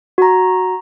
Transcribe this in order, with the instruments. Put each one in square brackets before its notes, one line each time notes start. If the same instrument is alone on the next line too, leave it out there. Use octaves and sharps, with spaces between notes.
[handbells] F#4 A#5